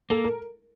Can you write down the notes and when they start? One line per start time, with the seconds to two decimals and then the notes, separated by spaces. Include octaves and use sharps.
0.10 A#3 A4
0.24 A#4